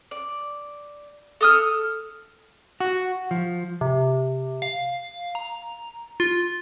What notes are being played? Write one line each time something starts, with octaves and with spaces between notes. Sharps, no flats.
D5
A4 D#6 F6
F#4
F3
C3
F5
A#5
F4